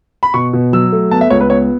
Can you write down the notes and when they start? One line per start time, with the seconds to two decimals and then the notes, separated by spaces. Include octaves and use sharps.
0.23 B5
0.34 B2 C#6
0.53 B2
0.73 F#3 E6
0.92 A3
1.11 B3 A5
1.21 E5
1.30 C#2 C#5
1.40 B4
1.49 B3 C#5